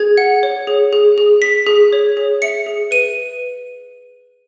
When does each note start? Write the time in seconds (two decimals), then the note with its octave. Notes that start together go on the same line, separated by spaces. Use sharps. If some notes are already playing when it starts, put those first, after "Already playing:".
Already playing: G#4 G#6
0.18 F#5
0.43 C#5
0.67 G#4
0.93 G#4
1.18 G#4
1.42 G#4 B6
1.66 G#4
1.93 C#5
2.17 G#4
2.42 E5 C#7
2.66 G#4
2.91 B4 D#7